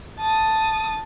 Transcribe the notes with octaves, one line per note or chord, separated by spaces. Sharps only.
A5 D#6